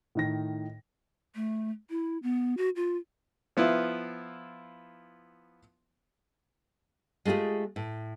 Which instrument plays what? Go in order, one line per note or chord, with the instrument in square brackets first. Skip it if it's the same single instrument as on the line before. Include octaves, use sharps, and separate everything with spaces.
[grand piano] A2 D#3 A#6
[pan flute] A3
E4
B3
F#4
F4
[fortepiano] F3 B3 E4 F4
[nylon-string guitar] G#3 A3 F4 G4 G#4
A2